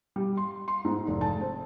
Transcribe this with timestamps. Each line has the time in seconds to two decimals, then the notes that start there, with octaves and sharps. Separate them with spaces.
0.16 G3
0.37 C6
0.68 C6
0.85 G#2
1.08 F1
1.21 A5
1.40 C4